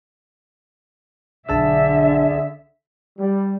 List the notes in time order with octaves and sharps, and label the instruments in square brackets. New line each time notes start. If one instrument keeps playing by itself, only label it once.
[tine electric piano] B1 A5 E6 [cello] D3 E5 [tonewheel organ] D4 G#4
[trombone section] G3